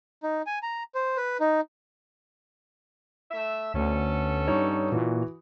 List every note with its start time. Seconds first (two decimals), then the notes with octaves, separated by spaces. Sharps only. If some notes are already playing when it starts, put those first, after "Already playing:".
0.23 D#4
0.47 G#5
0.63 A#5
0.95 C5
1.17 B4
1.40 D#4
3.31 A3 E5
3.74 D2 B3 C#4 A4
4.48 G2 D#4 C#5
4.92 A#2 E3 F#4